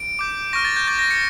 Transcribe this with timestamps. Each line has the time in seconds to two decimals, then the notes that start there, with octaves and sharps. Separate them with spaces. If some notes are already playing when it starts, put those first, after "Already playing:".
Already playing: D7
0.19 D6 G6
0.53 C#6 F6 A#6
0.65 A6
0.76 G6
0.87 D6 G6 A6
0.99 A#6
1.11 C#7